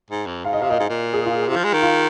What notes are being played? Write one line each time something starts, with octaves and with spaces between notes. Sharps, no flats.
G#2
F2
G#2 F5
D#5
C3 F5
A#2 D#5
G#2
A#2
G#4
F4
C3 F4
F3
G#3
D#3
F4